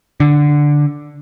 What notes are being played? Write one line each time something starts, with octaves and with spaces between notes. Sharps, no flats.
D3